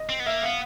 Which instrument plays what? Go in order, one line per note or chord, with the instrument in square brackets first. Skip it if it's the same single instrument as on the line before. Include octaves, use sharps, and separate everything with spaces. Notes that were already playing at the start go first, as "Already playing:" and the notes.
Already playing: [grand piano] D#5
[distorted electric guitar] C4
B3
[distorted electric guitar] A#3 [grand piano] E5
[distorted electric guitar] B3 [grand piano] F5